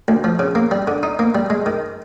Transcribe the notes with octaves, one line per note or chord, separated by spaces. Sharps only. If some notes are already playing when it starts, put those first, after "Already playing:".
D2
F3
C#3
A#3
G3
D3
D#4
A#3
G3
G#3
D#3